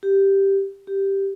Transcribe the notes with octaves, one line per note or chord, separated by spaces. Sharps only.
G4
G4